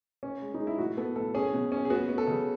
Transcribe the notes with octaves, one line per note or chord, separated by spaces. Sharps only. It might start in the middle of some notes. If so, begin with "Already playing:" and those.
C#4
G#3
D#4
G#3
E4
A2 F#4
B3 A4
A2 A4
C#4 G#4
B2
C#4
G#4
B3 F#4
B3
A4
C#3